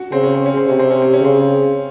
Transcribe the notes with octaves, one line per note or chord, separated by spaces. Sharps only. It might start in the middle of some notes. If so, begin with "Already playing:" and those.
Already playing: F#4
C#3 C4
C#4
C4
C#4
C4
C3 C#4
C4
C#4
C4
C#4
C#3 C4